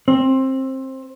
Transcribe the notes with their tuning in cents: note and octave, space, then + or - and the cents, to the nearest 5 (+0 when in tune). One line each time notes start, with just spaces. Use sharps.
C4 +20